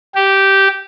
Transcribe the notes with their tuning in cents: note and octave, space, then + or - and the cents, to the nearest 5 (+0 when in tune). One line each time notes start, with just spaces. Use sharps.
G4 -10